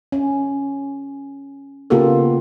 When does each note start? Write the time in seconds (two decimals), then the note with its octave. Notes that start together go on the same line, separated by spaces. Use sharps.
0.12 C#4
1.90 C#3 A#3 B3 F4 G4 A4